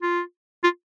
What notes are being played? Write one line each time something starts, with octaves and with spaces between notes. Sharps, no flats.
F4
F4